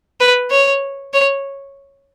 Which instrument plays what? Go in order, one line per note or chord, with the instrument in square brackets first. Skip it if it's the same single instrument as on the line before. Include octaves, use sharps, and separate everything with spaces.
[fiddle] B4
C#5
C#5